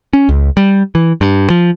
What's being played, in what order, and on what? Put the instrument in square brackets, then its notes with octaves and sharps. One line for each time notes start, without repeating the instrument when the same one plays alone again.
[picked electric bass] C#4
C#2
G3
E3
G2
F3